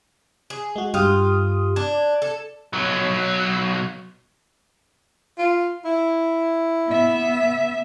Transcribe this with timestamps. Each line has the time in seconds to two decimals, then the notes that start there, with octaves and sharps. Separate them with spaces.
0.50 G#4
0.76 G#3 F#4
0.94 G2 F4 G4 D#6
1.76 D4 G#6
2.22 A4
2.73 B1 F#3
5.39 F4
5.85 E4
6.88 B3 E5